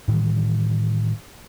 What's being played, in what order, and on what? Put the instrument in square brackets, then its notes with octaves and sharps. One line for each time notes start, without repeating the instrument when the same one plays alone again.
[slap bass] A2 D#3 E3 G3